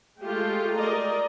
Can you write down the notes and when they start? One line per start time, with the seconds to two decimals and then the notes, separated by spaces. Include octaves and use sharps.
0.21 G#3 A3 F4 G4
0.75 A#4 D5 D#5 A#5